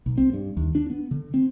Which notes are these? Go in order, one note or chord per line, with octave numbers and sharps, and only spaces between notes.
B1
C4
G2
D#2
D4
B3
D3
C4